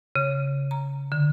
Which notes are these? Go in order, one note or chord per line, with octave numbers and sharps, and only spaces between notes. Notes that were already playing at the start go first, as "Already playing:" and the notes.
C#3
A#5
D3